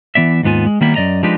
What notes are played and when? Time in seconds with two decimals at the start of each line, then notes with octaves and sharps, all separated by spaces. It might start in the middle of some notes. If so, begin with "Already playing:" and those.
0.15 E3 B3 D5 E5
0.43 D#2 G#2 B3 F4 G#5
0.66 G#3
0.81 D#3 G3 A#3 B3 E4
0.95 F#2 F#3 D5 D#5 A#5
1.23 F3 G#3 D4 D#4 G4 B4